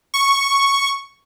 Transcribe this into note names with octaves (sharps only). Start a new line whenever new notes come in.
C#6